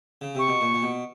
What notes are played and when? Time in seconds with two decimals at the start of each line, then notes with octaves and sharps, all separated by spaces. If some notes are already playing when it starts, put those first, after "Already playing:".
0.21 C#3
0.35 C3 C#6
0.48 B2
0.61 A#2
0.74 A#2
0.82 B2